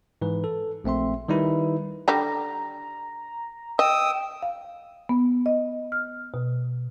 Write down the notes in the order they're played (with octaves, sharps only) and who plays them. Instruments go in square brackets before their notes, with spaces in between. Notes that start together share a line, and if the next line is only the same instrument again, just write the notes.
[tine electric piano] G#2 E3 B4
A4
A#1 A3 C4 E5 C6
D#3 G3 D#4 E4 B4
[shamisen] D3 G3 G4 [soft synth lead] A#5
[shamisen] D#5 [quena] G5 [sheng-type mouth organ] D#6 E6
[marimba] F5
B3
D#5
F6
B2